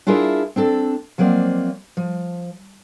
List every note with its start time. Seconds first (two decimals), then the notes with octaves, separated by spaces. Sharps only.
0.07 D4 E4 F4 G#4 A#4 E5
0.56 C4 D4 A4
1.18 F3 F#3 A#3 C4 D5 D#5
1.97 F3